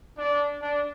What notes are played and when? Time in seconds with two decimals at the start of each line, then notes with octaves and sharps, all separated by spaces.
0.17 D4
0.61 D4